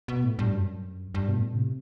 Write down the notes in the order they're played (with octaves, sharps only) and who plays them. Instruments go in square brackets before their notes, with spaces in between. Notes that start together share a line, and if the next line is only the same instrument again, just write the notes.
[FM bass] B2
A2
G2
F#2
G2
B2
A2
C3